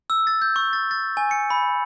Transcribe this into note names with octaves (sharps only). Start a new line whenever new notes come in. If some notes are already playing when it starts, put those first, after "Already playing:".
E6
A6
G6
C#6
A6
A6
G#5
C#7
B5